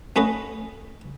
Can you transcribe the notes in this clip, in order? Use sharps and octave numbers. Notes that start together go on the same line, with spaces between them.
A3 C#4 B4 D#5 F#5